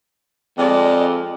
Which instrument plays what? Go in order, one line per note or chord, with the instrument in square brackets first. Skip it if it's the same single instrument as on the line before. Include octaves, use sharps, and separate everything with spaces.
[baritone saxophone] F2 [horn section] G#3 D5